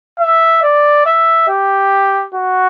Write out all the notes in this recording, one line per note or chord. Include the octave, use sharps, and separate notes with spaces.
E5
D5
E5
G4
F#4